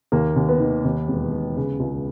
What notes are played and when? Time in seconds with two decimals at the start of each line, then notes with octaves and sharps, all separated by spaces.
0.12 D#2 A#3
0.36 D#2
0.49 B3
0.60 D#3
0.85 D#2
1.08 E1
1.32 E1
1.56 C#3
1.80 C#2